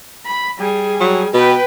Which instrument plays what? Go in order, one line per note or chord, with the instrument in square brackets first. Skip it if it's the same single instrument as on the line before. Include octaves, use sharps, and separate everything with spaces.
[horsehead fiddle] B5
G3 G#4
[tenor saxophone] F#3
[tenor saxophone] B2 [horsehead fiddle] B4 G5